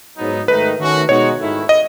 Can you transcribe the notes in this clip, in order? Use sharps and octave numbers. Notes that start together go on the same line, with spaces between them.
G#2 F#3 B3 D#4
G#2 D#3 A3 D#4 B4
D#3 A3 C#4 F#4
B2 G#3 D#4 F#4 C#5
G#2 D#3 A3 E4
D#5